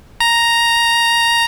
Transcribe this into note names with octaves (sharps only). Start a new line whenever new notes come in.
A#5